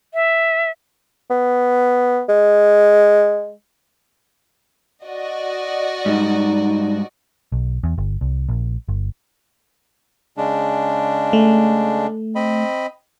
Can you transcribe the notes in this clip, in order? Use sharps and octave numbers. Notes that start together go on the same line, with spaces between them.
E5
B3
G#3
F#4 D5 D#5
G#2 G3 D#4
B1
E2
G1
C2
A#1
G1
C#3 G#3 D4
A3
C4 D#5 B5